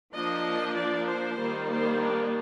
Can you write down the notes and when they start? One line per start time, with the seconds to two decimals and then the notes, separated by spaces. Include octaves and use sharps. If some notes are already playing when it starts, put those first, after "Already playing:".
0.13 F3 A#3 D4 D#5
0.76 D5
1.06 C5
1.38 D#3 G3 A#3
1.70 C5
2.01 D4